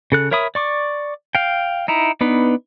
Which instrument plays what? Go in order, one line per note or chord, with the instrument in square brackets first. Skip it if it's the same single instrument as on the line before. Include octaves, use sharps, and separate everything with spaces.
[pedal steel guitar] C#3 A4 F#6
A#4 C#5 E5 B5 D#6
D5 C#6 D6
F5 G5
D#4 E4 A#5
B3 D4 D#4 B4